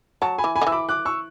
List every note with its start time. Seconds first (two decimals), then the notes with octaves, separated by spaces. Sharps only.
0.22 F#3 A5 C#6
0.38 G#5 B5
0.44 E3
0.56 G#5 B5
0.61 D3
0.67 E3 E6
0.72 B5 D6
0.89 D6 F#6
1.05 C#6 E6